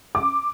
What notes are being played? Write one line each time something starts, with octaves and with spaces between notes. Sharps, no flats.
D6